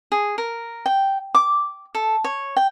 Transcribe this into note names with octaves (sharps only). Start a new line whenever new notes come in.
G#4
A#4
G5
D6
A4
C#5
G5